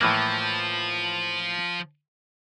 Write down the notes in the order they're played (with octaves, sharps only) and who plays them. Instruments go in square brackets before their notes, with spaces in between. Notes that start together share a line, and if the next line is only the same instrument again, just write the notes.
[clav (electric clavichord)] A2 E3 A#3 [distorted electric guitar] F3